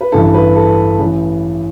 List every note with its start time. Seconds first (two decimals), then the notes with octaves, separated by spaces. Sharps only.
0.01 B4
0.12 A1 G2 E3 A4
0.34 B4
0.56 A4
0.99 A1 A2 E3